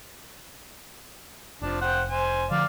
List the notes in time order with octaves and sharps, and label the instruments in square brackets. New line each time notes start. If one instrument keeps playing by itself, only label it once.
[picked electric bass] F1 [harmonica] F3 D4
[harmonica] C5 F#5 G5
C5 G#5
[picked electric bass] D3 F3 [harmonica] D5 F5